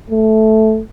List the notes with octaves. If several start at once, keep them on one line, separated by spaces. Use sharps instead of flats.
A3